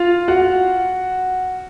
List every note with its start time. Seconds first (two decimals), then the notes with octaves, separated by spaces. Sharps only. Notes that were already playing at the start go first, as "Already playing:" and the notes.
Already playing: F4 F5
0.28 F#4 F#5